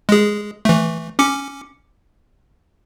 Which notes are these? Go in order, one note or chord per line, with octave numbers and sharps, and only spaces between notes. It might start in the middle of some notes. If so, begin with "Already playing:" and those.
G#3 G#4
E3 A3
C#4 D6 C#7